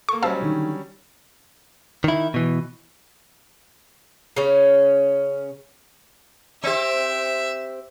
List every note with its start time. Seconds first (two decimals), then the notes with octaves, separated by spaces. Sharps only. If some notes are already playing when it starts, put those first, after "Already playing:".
0.09 A#3 A4 C#6
0.22 F#3 G3 C#4 C5 D#5 F5 A5 E6
0.40 D3 D#3
2.04 D#3 E4
2.34 B2 E3
4.36 C#3 C#4
6.63 C4 G4 E5